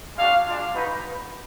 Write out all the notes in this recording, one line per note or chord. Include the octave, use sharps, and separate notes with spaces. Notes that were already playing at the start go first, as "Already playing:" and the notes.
G#3 D4 F#4 F5
G#3 D4 F4
G#3 D#4 F#4 B4